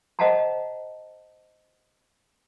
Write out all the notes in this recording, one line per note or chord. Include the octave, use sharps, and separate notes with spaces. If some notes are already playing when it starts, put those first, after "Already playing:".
C5 D#5 F5 F#5 A5 A#5